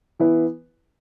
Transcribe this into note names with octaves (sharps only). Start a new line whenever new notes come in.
E3 B3 E4 B4